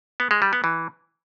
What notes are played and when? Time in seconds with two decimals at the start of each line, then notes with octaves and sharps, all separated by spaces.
0.20 B3
0.31 G#3
0.42 G3
0.53 B3
0.64 E3